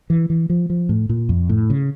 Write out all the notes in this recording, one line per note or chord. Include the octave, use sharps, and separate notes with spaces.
E3
E3
F3
F3
A2
A#2
F2
A2
C#3